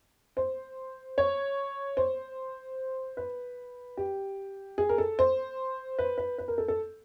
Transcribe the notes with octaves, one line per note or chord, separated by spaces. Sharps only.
C5
C#5
C5
B4
G4
G#4
A#4
A4
C5
B4
B4
B4
A#4
A4
A4